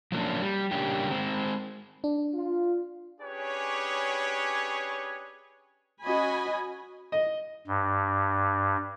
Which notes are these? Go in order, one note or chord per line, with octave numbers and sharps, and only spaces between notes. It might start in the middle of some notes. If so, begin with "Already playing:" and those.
F3 F#3 A#3 C#4 D4
G3
C#3 G3 A#3 C#4 D4 G4
G#3 C4
D4
F4
C#4 D4 G4 G#4 B4 C#5
C#4 F#4 D#5 G#5 B5
D#5
G2